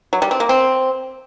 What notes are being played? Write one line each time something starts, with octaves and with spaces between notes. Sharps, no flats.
F#3
G3
C4
A#3
C4